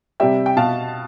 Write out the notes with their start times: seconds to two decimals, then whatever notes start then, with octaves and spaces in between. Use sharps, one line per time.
0.20 C3 G3 E5 G5
0.46 G5
0.57 B2 F5 A5